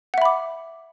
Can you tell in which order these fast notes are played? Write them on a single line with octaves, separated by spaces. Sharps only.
F#5 E5 B5 D6